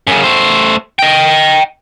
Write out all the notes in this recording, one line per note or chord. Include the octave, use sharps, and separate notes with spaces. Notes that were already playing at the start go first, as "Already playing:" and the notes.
F#2 C#3
A3 C5
D#5 G5